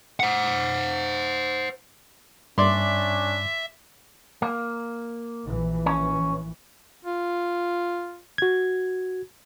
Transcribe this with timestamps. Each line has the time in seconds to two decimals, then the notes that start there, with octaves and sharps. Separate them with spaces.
0.20 C5 F#5
2.58 G2 C#4 D4 D5 E5 C6
4.42 A#3
5.45 A#1 E3
5.86 C#4
7.05 F4
8.38 F#4 G#6